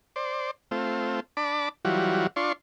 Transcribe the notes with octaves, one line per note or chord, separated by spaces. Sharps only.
C5 D5
A3 C4 F4
D4 A5 B5 D6
E3 F#3 G3 F4 F#4
D4 F4 C6 C#6